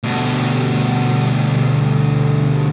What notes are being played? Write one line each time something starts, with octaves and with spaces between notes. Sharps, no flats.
D2 B2